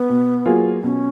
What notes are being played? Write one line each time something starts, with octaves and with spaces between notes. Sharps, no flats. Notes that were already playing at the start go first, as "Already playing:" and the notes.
Already playing: B3
B2
F#3 A#3 F4 G#4
B2 C#4